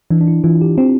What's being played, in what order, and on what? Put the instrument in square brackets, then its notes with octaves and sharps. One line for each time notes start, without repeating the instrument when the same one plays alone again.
[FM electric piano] E3 [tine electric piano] D4
[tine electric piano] D4
E4
[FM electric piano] E3 [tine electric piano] F4
[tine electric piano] G4
[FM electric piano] C4